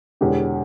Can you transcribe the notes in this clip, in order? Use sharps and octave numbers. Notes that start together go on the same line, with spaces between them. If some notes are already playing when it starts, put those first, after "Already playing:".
E1 E2 D3 G4